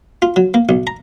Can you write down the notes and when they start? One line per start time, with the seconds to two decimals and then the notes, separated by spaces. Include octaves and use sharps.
0.22 F4
0.36 F#3
0.54 A#3
0.69 B1
0.87 A#5